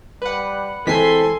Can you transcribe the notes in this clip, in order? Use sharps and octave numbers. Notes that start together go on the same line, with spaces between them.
G3 B4 F#5
E3 G#3 C4 A4 G#5 C6 B6 C7